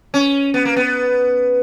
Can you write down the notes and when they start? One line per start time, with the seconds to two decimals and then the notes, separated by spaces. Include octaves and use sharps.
0.14 C#4
0.54 B3
0.65 A#3
0.76 B3